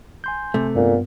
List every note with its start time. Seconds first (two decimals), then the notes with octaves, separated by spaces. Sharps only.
0.24 G#5 C6 G6
0.54 C3 A3
0.75 G2 A#2 B3